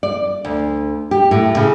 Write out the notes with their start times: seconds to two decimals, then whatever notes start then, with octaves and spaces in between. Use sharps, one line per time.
0.03 D5
0.45 D2
1.11 G4
1.31 A2
1.57 C#3